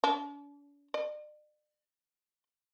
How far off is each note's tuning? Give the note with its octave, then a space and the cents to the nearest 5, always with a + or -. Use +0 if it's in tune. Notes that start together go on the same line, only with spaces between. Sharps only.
D4 -45
D5 +45